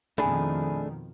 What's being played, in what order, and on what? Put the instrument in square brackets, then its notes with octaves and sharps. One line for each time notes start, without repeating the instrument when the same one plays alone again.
[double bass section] F2 B2 D#3 [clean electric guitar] A3 D4 G#4 [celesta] G#5 B5